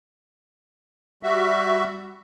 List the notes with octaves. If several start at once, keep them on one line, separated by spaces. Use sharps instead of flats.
G3 F#4 E5